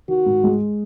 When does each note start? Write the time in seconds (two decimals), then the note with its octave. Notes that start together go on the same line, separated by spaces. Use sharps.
0.08 D#3 F#4
0.26 G#2
0.44 G#3